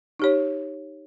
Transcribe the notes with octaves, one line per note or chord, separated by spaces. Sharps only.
D#4 G4 C#5